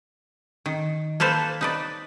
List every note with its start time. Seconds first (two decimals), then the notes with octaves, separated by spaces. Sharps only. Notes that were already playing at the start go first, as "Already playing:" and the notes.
0.66 D#3
1.20 A#3 A4 B4 C5
1.61 D#4 B4 D5